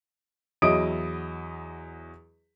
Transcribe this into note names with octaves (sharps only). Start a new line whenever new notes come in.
E2 F#3 E4 D#5 D#6 D7